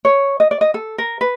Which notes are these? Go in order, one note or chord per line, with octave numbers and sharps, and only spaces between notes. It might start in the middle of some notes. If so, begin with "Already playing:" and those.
C#5
D#5
D5
D#5
A4
A#4
B4